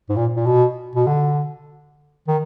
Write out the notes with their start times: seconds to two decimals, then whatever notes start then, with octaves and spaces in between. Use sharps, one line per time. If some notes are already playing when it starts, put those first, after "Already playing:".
0.09 G#2
0.16 A#2
0.36 A#2
0.46 B2
0.95 B2
1.07 D3
2.28 D#3